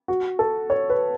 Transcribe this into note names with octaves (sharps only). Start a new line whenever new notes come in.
F#4
A4
C#5
B4